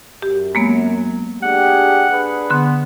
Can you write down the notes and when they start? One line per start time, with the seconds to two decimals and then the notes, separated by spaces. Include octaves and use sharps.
0.22 F#2 G4
0.55 F#3 G#3 A#3 B3
1.43 D4 G4 G#4 F#5
2.11 D4 G#4 B4
2.50 D3 B3 C6